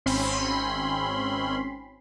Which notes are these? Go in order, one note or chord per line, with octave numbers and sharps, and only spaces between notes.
G#1 C4 C#4 B5 C6